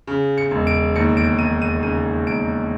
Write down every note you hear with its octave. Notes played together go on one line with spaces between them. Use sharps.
C#3
C#7
E1
D7
D#2 C#7
D7
E1 D#7
D#7
C#3 D#7
E1 D7